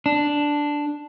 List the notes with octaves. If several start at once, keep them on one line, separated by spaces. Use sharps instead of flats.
D4